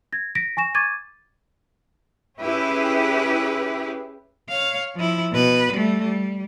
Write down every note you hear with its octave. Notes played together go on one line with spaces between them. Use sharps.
G#6 A#6
A#6 B6 D7
G#5 C#6 A#6 E7
C#6 D6 G#6 A6 D#7
C#4 E4 G4 G#4 B4
C#5 F5
F3 E4
B2 B4
G3 A3
G3